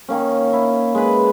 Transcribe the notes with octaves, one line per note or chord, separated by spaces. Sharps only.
D#3 A#3 C#4
E4
G#3 B4